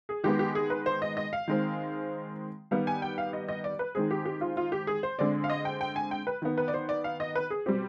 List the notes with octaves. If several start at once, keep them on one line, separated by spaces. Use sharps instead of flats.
G#4
D#3 G#3 B3 G4
G4
G#4
B4
C5
D#5
D#5
F5
D#3 G#3 C4
D#3 G3 B3 F5
G#5
G5
F5
D#5
D#5
D5
B4
D#3 G#3 C4 G#4
G4
G4
F4
F4
G4
G#4
C5
D3 G#3 C4 D5
F5
D#5
G5
G5
G#5
G5
B4
D#3 B3
B4
D5
C5
D5
F5
D#5
B4
G#4
B2 G3 C4 G4